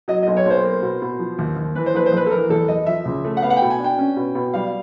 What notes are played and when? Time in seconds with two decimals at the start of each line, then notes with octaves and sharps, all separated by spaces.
0.08 F#3 D#5
0.23 B1 D#5
0.37 C#5
0.45 B1 C5
0.64 A#3
0.82 B2
1.02 B2
1.19 F3
1.39 D#2
1.56 D#2
1.75 E3 B4
1.86 C5
1.95 A#1 B4
2.06 C5
2.12 A#1 B4
2.26 A4
2.31 E3 A#4
2.50 E2 A4
2.68 E2 D#5
2.86 F3 E5
3.05 C#2
3.25 A3
3.37 F#5
3.42 B3 F5
3.50 F#5
3.56 G5
3.62 B2
3.70 G#5
3.79 D4 G5
3.98 C#4
4.16 B2
4.35 B2
4.54 G3 F5